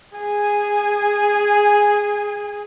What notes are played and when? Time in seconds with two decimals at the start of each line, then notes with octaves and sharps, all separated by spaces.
0.16 G#4 G#5